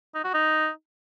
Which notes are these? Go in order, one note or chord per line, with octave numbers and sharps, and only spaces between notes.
D#4
F#4
D#4